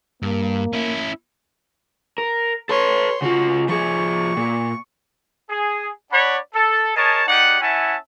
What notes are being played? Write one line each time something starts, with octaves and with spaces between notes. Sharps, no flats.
G2 A#3
C#4 E4
A#4
A4 B4 C#5 C6
C#3 F4 F#4
F3 G#4 C#6
A#2
G#4
D4 C#5 D5 F#5 B5
A4
G#4 A#4 C#5 D#5 A5
G#3 D#4 G4 D5 F#5
C#4 E4 E5 F#5 G#5 A5